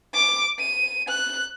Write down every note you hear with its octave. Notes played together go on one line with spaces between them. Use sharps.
D6
D#7
F#6